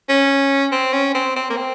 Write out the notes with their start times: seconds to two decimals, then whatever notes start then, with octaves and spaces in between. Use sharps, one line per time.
0.09 C#4
0.72 C4
0.93 C#4
1.14 C4
1.36 C4
1.50 A#3
1.57 C4